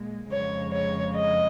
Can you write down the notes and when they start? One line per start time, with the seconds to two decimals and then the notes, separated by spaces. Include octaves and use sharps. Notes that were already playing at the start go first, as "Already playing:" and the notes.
Already playing: A#2 G#3
0.31 F2 C#3 G#3 C#5
0.73 C#5
1.14 D#5